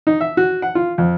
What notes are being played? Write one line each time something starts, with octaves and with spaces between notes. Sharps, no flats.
D#4
E5
F#4
F#5
F4
F2